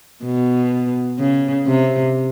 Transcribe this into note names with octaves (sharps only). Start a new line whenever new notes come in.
B2
C#3
C3